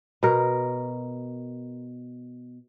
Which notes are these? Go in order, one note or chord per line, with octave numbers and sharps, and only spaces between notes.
B2 A#4